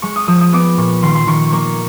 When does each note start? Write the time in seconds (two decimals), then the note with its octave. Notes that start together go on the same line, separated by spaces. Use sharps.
0.02 G#3 C#6
0.16 D#6
0.27 F3 D#6
0.41 D#6
0.52 B3 D6
0.77 A#2 C#6
1.02 D#3 C6
1.15 C6
1.27 D#3 C#6
1.52 A#3 C#6